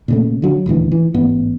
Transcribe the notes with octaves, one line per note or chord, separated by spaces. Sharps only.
A#2 C#3 A3
D3 F#3
D#1 A1 D2 E3
E3
A1 G#2 B3